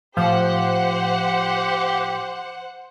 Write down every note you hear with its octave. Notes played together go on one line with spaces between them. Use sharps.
A2 F3 G4 C5 F5 F#5